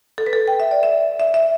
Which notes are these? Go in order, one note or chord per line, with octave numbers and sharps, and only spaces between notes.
A4
B4
A4
G5
E5
D5
E5
E5
E5